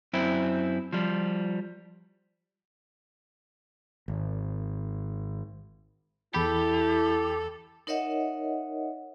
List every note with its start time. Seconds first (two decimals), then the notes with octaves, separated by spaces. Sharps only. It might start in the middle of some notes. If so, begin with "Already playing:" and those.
0.13 F#2 C4 E4
0.93 F3 G3
4.08 G#1
6.34 E2 E4 G4 A4 B5
7.87 D#4 A#4 C#5 D#5 E5 F#5